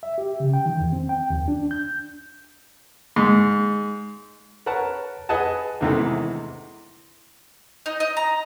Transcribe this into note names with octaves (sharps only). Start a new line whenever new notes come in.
E5
G4
C#3
G5
D#3
E2
C4
G5
D#2
D4
G6
G#2
A#4 B4 C#5 F#5 A5
G#4 B4 D#5 F#5 G#5 A5
E2 G#2 C3 D#3 E3 A3
D#4
D#5
A#5